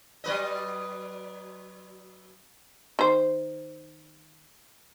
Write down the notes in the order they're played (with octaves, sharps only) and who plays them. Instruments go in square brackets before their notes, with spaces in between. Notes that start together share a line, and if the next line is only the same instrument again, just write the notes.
[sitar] F#3 B4 D#5
[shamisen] D#3 C5